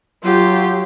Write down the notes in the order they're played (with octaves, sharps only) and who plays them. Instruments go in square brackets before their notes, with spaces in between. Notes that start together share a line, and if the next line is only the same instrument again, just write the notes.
[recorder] F#3 [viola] F4 G4